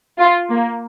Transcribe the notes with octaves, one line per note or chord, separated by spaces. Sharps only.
F4
A#3